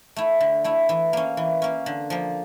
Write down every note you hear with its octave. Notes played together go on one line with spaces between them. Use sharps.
A3 E4
D3
A3 E4
E3
A#3 C#4
E3
A#3 C#4
D3
F3 A#3